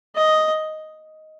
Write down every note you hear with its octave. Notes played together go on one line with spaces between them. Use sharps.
D#5